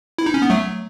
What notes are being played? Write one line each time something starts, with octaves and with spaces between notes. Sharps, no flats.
E4
D#4
C#4
B3
F#3 A3